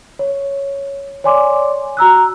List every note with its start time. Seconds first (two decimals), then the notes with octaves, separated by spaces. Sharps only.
0.19 C#5
1.24 C#5 D5 G#5 C6 D6
1.97 F#4 A#5 E6 F#6